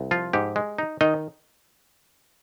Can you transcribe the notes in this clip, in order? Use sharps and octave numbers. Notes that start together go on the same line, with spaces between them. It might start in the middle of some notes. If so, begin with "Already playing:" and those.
Already playing: C2
F3 F4
G#2 G4
G#3
D#4
D#3 D#4 D#5